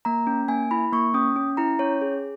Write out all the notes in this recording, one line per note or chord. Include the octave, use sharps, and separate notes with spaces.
A#3 A#5
C#4
A#3 G#5
E4 B5
A#3 C#6
C#4 D#6
C#4
E4 A#5
C#4 C#5
G#4